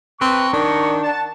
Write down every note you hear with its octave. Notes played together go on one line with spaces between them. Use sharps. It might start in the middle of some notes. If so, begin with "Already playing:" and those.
C4 B4 A#5 C#6
D#3 D4
F#5 A5